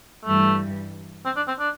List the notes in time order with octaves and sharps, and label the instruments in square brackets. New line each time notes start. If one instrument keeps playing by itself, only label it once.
[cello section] G2 E3 G3 [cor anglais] A3
[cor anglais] C4
D4
C4
D4